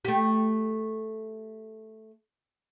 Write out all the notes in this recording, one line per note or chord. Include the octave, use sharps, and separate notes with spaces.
A3 G4